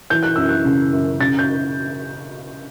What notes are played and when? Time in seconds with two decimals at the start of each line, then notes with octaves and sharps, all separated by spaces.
0.10 E3 G6
0.23 F#6
0.36 F#2 E6
0.49 F#6
0.65 C#3
0.93 F#2
1.20 C#3 A6
1.39 G6